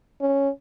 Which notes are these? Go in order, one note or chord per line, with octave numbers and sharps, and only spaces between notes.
C#4